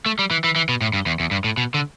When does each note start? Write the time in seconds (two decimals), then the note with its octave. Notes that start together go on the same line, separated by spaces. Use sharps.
0.06 A3
0.19 G3
0.31 E3
0.44 E3
0.56 E3
0.69 B2
0.81 A2
0.93 G2
1.06 E2
1.20 E2
1.31 G2
1.44 A2
1.57 B2
1.74 D3